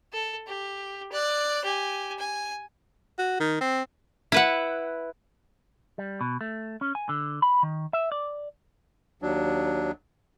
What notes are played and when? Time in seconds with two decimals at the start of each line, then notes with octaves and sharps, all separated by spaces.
0.13 A4
0.47 G4
1.12 D5 F#6
1.64 G4 G#5
2.19 G#5
3.19 F#4
3.40 D#3
3.61 C4
4.32 E4 B4 F#5
5.98 G3
6.21 B2
6.41 A3
6.81 C#4
6.95 G#5
7.09 D3
7.42 B5
7.63 D#3
7.93 E5
8.12 D5
9.22 D#2 F#3 D4